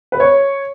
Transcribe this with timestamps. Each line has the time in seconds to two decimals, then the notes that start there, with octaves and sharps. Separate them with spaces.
0.12 B4
0.20 C#5